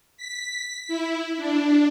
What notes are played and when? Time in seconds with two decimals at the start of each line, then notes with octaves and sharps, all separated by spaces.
0.17 B6
0.88 E4
1.37 D4